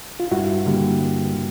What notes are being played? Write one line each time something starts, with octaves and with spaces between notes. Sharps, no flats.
F4
G2 E4 F#4
D3 G3 A#3
G2
D3